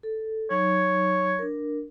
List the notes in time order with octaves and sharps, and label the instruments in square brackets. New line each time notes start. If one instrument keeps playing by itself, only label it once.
[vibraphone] A4
[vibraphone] F#3 D#4 [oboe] C#5
[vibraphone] D4 A#4